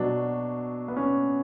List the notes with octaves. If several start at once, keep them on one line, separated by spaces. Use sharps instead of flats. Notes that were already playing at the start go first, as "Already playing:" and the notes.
Already playing: B2 F#3 D4
B3
C#4